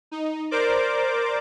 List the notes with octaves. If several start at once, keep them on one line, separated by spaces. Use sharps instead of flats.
D#4
A#4 C5 D5 D6